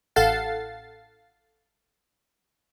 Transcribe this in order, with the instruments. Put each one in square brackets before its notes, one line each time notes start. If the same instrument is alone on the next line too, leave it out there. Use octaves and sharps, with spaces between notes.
[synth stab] A1 A4 F5 F#5 A6 C7